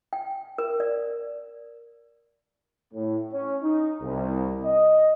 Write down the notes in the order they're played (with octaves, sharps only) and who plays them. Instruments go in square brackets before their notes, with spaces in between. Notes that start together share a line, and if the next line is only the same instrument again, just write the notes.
[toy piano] G5
A#4
D5
[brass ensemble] A2
C#4
D#4
C2
D#5